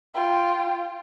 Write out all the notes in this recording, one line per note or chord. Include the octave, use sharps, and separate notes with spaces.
F4 G5